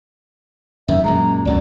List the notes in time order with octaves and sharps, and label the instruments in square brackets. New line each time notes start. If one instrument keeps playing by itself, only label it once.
[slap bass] F#2 D#3 [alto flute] E5
[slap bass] F#2 A#2 G#3 [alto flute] A#5
[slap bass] C#2 F#2 B2 [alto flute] D5